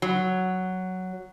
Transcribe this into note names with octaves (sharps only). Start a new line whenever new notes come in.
F#3